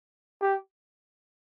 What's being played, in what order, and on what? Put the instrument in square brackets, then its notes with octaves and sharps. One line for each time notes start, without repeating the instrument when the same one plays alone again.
[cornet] G4